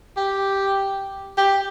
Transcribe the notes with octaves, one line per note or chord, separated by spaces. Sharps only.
G4
G4